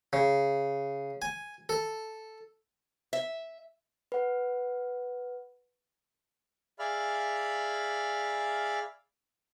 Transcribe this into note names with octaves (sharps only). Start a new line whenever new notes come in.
C#3
G#5
A4
E5
B4 F#5
G#4 D5 E5 F5 B5 F6